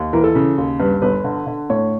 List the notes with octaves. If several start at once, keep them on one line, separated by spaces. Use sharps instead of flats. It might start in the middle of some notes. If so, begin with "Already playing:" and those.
Already playing: D#2
E3 A#4
A4
C#3
D#2
G2 B4
G1 B4
D3
D3
A2 C#5